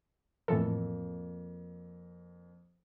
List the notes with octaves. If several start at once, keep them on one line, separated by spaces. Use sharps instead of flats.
F2 A2 E3 A#3 A4